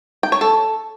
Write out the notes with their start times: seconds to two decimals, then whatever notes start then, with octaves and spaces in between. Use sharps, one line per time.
0.23 G5
0.32 C#5
0.41 A4